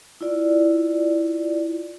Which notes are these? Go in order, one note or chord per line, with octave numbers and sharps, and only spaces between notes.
E4 F4 D5